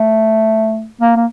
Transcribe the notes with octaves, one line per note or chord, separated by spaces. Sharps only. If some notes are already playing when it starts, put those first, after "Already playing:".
Already playing: A3
A#3
A#3